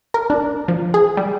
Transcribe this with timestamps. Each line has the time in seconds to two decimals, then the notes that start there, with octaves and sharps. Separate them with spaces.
0.14 A#4
0.30 D4
0.68 F3
0.94 G#4
1.17 G3